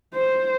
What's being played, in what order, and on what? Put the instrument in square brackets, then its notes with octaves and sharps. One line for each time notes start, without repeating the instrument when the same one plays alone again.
[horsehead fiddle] C5